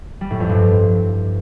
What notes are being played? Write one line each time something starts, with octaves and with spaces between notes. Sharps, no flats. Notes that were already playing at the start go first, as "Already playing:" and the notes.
G3
A2
F2
G2